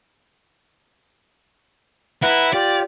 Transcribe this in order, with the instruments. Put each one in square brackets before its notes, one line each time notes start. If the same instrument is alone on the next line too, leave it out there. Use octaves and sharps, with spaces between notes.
[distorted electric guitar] E4 [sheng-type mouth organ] B4 F#5 A#5
[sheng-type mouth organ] F4 G4 [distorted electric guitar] D5